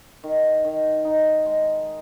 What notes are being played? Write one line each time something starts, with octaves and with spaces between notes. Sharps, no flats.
D#3
D#3
D#4
G#3